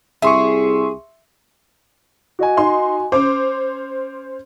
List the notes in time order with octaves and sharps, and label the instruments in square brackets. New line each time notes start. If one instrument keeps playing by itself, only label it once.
[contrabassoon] C2 [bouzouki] G#4 [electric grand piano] E5 C6 C#6
[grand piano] F#4 D#5 G#5
[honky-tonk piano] D#4 C6
[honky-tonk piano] C#4 C5 [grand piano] D6